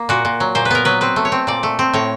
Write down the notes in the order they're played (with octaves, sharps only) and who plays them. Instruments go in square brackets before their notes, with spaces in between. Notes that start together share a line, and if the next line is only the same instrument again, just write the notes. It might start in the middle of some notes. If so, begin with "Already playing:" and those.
Already playing: [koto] A#3
A#2 F#4
A#2
F#3
A#2 C5
B4
B3 A#4
F#3 B4
C4 B4
A3
C#5
C4
A#2 D5
A3
C4
A2 C#5